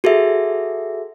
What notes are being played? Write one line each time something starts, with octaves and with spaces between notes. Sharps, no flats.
F#4 G#4 A4 E5